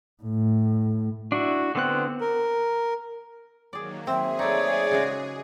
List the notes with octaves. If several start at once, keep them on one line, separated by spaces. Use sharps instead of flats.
A2
D4 E4 F#4
D3 B3 C4 F#6
A#4
D#3 F#3 A#3 G#4 D5
C4 G#4 E5
A3 D#4 C#5 D5
C#3 G#3 F#4